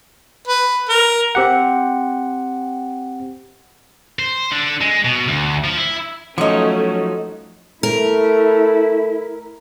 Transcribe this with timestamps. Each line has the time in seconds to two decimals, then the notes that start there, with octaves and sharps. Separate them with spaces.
0.47 B4
0.89 A#4
1.35 C4 G4 F#5
4.19 C5
4.52 D3
4.81 G#3
5.05 B2
5.28 D2
5.64 F3
5.78 E4
6.38 F3 F#3 A3 C#4 D#4 D#5 C#6
7.83 A3 E4 A#4